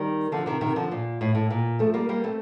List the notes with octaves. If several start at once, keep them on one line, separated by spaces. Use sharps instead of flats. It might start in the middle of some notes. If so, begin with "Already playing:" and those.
Already playing: D#3 G3
D3 F3
C3 D#3
C3 D#3
D3 F3
A#2
A2
A2
A#2
F3 A3
G3 A#3
G3 A#3
A3 C4